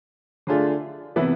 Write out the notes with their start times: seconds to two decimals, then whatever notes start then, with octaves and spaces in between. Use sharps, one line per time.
0.47 D3 A3 D4 F4 G#4
1.16 C3 E3 B3 E4 B4